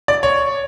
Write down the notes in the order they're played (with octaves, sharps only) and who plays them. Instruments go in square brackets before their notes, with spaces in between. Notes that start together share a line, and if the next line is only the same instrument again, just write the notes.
[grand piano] D5
C#5